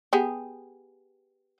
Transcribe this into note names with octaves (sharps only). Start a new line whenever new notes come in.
B3 G4 G#4